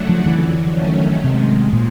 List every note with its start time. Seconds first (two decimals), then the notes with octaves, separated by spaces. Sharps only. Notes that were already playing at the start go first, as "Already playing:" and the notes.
Already playing: C#3 F#3 A3 D4 F#4
0.09 F3
0.25 F2 D3 E3 F#3
0.74 D#3 F#3 A3 C#4
1.23 G#2 C3 D#3 G#3
1.73 A#2